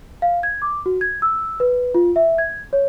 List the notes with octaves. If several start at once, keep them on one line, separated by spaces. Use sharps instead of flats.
F5
G#6
D6
F#4
G#6
E6
B4
F4
E5
G#6
C#5